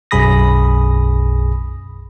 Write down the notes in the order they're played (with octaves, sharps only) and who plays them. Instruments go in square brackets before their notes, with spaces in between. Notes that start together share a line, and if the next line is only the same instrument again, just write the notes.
[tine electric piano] B1 F#2 G#4 B5 D#6 A#6